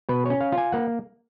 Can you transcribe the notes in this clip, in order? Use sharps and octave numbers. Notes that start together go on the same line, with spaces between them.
B2 B4
C#4 C#5
F5
F4
G#5
A#3 F#5